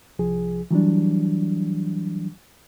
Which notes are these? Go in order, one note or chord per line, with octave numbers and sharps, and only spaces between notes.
C2 F3 G#4
E3 F#3 G3 D4